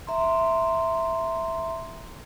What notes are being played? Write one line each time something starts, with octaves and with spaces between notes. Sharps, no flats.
E5 A#5 C6